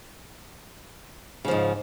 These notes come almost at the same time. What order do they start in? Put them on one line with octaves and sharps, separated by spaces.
C#3 F3 G#2